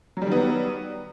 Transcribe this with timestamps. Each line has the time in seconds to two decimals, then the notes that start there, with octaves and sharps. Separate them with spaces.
0.17 F#3
0.22 G3
0.27 D#3
0.32 B3